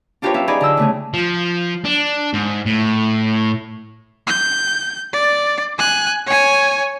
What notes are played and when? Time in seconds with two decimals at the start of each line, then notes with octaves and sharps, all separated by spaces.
0.22 D4 F4 G4 A#4 B4 C#5
0.34 C#4 G4 E5 F5
0.48 D#4 G4 G#4 D5 G#5 B5
0.61 D3 A#5 E6
0.77 C#3 A3 G#4
1.14 F3
1.85 D4
2.34 G#2
2.66 A2
4.27 G6
5.13 D5
5.78 G#5 F#6
6.26 C#5 G#5